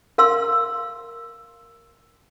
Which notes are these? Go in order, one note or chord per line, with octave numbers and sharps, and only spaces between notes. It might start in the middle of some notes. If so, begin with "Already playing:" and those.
A#4 F5 C6 E6